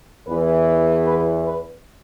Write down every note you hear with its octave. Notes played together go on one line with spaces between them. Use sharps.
E2 E3 B4
B4
B4